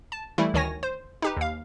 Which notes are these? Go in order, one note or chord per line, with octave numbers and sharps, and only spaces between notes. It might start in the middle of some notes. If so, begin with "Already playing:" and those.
A5
E3 G3 A3 E4
D2 D#3 C#5 G#5 A#6
C5
D#4 G4 B4
D#2 F5